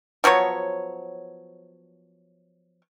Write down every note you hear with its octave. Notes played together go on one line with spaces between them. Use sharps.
F3 F#3 B3 C#5